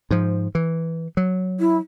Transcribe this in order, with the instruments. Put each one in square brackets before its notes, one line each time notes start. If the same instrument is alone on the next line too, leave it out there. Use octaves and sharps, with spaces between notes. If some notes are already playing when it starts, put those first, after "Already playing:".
[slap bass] G#2 F3
E3
F#3
[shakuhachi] E4